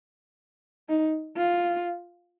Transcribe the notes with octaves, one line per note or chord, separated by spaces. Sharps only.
D#4
F4